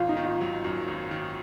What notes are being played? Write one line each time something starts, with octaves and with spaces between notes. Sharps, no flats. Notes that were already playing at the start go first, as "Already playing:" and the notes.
Already playing: G#1 F4
D#4
D#3
F4
F#3
F#2
G#1
D#3